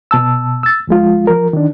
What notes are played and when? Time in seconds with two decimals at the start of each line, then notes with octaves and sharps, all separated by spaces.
0.11 B2 A5 E6
0.63 E6 A6
0.87 D2 F3 G#3 F4
1.27 F3 A#4
1.53 D#3 D4